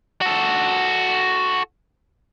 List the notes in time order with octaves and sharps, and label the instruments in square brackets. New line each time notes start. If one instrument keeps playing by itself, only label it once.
[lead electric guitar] F#4 A4